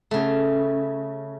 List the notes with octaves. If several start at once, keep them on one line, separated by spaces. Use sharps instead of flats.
C#3 A3